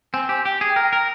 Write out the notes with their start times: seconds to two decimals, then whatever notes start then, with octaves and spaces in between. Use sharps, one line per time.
0.13 C4 G#5
0.29 G4 G#5
0.45 G4 G5
0.61 G#4
0.76 A#4
0.93 A#4